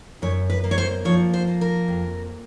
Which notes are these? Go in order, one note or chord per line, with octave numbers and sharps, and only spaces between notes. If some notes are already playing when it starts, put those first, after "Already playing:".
F#2 C#5
B4
A#3
C#5
C5
F3 C#5
C5
A#3
A#4
F2